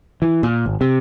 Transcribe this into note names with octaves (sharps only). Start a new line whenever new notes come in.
E3
A#2
G#1
C3